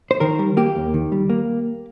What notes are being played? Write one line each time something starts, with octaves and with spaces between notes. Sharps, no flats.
C5
D#3 A#4
G3
A#3 G4
D#2
D#3
G3
A#3